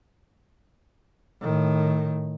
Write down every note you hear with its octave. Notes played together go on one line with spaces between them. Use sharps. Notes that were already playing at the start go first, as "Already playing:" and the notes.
A2 D#3